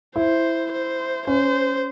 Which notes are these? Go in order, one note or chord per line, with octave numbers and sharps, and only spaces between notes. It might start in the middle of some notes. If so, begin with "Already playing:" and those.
E4 C5
C5
C#4 C5